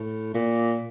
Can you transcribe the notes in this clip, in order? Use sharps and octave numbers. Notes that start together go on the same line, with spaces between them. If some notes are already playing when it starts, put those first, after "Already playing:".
Already playing: A2
A#2